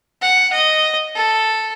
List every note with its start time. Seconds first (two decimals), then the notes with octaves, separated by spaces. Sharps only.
0.22 F#5
0.52 D#5
1.15 A4